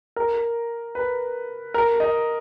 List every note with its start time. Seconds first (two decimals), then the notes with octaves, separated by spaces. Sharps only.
0.16 A#4
0.95 B4
1.74 A#4
2.00 D#5